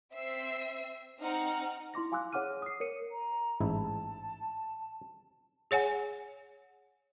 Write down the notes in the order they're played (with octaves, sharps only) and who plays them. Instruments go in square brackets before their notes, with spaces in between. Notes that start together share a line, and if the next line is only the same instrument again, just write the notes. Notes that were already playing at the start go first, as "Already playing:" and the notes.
[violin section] C4 E5 E6 C7
C4 D#4 F#5 A#5 F6
[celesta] E4 C6 D6 A#6
F5 G#5 C6 D6 E6 F#6
G#4 C#5 F#5 D6 F6 D#7
D#6 C7
A#4 C#5 C#7 D#7
[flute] A#5
[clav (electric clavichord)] A1 G#2 E4 [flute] A5
[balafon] G#4 C#5 F#5 G#5